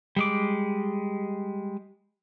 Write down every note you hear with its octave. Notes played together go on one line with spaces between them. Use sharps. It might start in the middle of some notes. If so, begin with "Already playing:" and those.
G3 G#3 D6